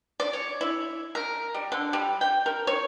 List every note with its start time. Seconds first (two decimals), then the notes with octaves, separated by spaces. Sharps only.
0.20 D5
0.33 C#5
0.61 E4
1.15 A#4
1.54 G3
1.72 D3
1.93 G3
2.21 G5
2.46 A#4
2.67 C#5